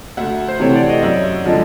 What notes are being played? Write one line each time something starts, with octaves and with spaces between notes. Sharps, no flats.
D2 E5 F#5
C5
C3 E3 A3 C4 C#5
D5
D#5
F#2 D5 E5
D3 F3 G#3